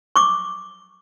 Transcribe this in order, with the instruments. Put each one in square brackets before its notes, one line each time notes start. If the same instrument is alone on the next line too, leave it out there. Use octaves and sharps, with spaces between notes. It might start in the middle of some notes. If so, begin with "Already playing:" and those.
[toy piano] C#6 D6